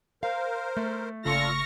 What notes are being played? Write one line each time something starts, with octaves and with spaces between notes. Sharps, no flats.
A#4 C5 F5
A3
G1 A#2 C#3 F4 A4 C#6 F6 A#6